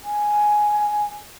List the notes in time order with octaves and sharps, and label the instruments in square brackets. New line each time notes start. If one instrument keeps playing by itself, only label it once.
[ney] G#5